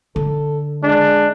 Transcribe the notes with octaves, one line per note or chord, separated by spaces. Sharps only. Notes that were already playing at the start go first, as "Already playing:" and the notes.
D3 A4
G#3 D4